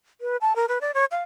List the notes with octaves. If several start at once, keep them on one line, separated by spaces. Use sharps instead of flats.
B4
A5
A#4
B4
D5
C#5
F5